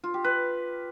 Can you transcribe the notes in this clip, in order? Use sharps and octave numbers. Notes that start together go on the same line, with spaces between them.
F4
G4
B4